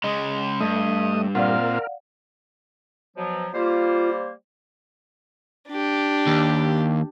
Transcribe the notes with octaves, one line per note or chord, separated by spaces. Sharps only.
C#3 G#3 D#5 D#6
G2 A3 D#5 A5
A#2 C4 F4 A#4 D5 F5 F#5
B2 F3 F#3
G3 A#3 F4 C5
D4 G4
D#2